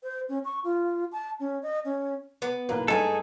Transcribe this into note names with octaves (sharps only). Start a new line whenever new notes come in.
C5
C#4
C#6
F4
A5
C#4
D#5
C#4
B3
B1 E3 A#3 B4
G2 A3 D#4 F4 G#4 A4 G#5